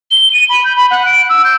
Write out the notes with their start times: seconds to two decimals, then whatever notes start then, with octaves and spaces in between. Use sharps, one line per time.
0.11 G7
0.33 D#7
0.49 B5
0.64 G6
0.76 B5
0.91 F#5
1.06 D7
1.30 E6
1.44 G6